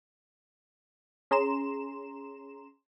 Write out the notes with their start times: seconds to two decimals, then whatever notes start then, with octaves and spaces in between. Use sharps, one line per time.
1.31 C#4 G#4 A#5 C6 E7